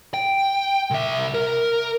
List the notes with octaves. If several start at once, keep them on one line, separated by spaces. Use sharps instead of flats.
G5
C2 E5
A#4